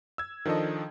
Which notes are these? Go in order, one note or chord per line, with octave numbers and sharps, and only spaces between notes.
E6 G#6
D#3 F3 D4 A4 D#5